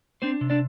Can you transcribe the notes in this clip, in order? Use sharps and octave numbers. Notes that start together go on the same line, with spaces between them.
C4 D4 C5
C3
D4 D5